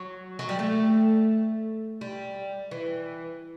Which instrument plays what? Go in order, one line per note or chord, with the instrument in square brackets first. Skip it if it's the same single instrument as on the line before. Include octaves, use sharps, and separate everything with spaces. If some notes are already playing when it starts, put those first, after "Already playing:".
Already playing: [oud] F#3
F#3
G3
A3
G3
E3